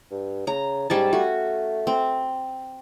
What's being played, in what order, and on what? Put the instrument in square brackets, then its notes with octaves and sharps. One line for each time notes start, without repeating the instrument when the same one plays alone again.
[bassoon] G2
[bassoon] C#3 [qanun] A#5
[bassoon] G#2 [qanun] G3 C#4 A5
[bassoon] A3 [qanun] F#4
[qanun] C4